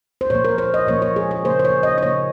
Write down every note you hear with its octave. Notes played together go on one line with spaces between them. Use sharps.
C5
A#2 F3 A#3 C#5
A#4
C5
D#5
A#2 F3 A#3 C#5
C#5
G#4
G#4
C#3 F3 A#3 C5
C5
C#5
D#5
D#5
C#3 F3 A#3 C#5